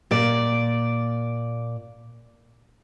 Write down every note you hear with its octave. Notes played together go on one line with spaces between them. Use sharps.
A#2 D5